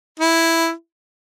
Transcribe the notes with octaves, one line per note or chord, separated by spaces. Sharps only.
E4